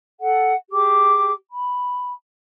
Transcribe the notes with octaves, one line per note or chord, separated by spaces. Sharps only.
A4 F#5
G4 G#4 D6
B5